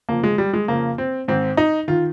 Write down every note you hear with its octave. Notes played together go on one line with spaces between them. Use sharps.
F2 C#3 F3 A#3
G#3
G3
G#3
F2 C#3 F3 A#3
C4
G#2 D#3 C4
D#4
D#3 F4